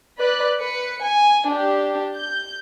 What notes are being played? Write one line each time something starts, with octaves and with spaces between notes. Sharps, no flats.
B4 D5 F#6
B4 C#7
G#5
D4 G4
G6